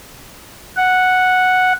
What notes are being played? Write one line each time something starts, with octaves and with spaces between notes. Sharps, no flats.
F#5